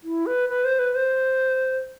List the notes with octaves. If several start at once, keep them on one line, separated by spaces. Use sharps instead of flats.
E4
B4
B4
C5
B4
C5